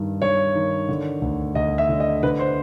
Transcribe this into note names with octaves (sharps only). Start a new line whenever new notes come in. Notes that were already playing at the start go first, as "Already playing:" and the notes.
Already playing: G2 D#3
G2 C#5
D#3
D3
D2
D2 D#5
E5
D3
D#5
D3 B4
C5